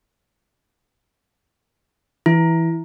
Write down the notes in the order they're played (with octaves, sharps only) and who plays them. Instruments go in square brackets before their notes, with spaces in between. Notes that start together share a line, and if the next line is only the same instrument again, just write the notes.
[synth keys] E3 [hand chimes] E4